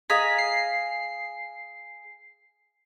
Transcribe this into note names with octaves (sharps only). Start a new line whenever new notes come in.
G#4 D#5 F5 A#5 B6
C7